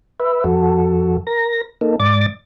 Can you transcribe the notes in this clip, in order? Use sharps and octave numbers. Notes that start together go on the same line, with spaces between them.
B4 E5
F2 F#4 A4
A#4 A#6
A#3 D#4 A4
G#2 D5 D6 A6